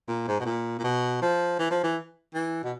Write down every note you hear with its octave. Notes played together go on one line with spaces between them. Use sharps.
A#2
G#2
B2
A#2
A#2
B2
F3
E3
F3
E3
E3
B2